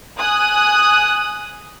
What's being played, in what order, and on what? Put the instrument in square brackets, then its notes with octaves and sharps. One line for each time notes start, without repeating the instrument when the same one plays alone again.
[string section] G#5 D#6 F#6